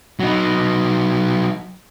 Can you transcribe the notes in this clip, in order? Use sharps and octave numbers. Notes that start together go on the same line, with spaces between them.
F#3 D#4